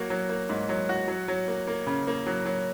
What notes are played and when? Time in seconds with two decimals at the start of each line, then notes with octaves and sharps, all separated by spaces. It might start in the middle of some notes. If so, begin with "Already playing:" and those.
Already playing: F#3 A#3 F#4
0.10 F#3
0.29 A#3
0.49 G#2
0.69 F#3
0.89 F#4
1.08 F#3
1.28 F#3
1.48 A#3
1.67 A#3
1.87 C#3
2.07 A#3
2.26 F#3
2.46 F#3